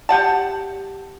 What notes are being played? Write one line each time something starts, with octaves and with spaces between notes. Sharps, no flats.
G4 F#5 A5